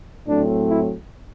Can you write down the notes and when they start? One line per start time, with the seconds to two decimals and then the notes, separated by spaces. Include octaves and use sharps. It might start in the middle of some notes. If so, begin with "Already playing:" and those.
0.28 A2 F#3 A3 C4 D4
0.68 E4